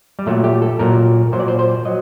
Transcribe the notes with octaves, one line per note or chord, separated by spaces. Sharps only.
G3
A#2 F#3 A3
G4
A4
A#2 F#3 A#4
A#2 F#3 C5
D5
C5
C5
F#3 D#5